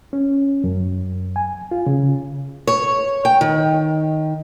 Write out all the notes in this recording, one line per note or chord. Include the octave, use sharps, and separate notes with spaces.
C#4
F#2
G#5
F4
C#3
C#5
G5
D#3